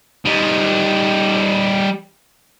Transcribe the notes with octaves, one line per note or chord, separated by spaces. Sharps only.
G3 D#4